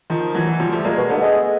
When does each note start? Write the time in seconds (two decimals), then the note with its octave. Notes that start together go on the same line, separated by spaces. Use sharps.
0.10 D#3 F3
0.35 E3 F#3
0.47 E3 F#3
0.60 F3 G3
0.72 G3 A3
0.85 A#2 G#3 A#3
0.97 B2
1.09 D3 A3 B3
1.22 G#3